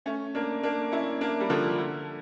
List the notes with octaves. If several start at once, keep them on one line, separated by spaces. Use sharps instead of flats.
A3 C#4
A#3 D4
A#3 D4
C#4 E4
A#3 D4
G3
D3 F3
D3